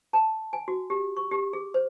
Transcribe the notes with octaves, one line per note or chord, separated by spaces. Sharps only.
A5
G#5
F#4
G4
C#6
G4
G#4
C5